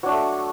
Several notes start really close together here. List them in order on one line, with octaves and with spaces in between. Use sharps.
F#3 D4 F#4 A3